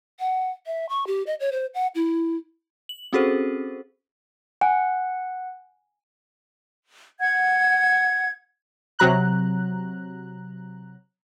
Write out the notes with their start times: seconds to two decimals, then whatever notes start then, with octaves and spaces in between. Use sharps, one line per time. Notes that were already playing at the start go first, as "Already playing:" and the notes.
0.20 F#5
0.66 E5
0.89 C#6
1.07 G4
1.27 D#5
1.40 C#5
1.52 C5
1.74 F#5
1.95 E4
2.89 F#7
3.13 C4 C#4 F#4 G#4 A4 C5
4.61 F#5 G#5
7.20 F#5 G#6
8.99 C3 F#3 A#5 F#6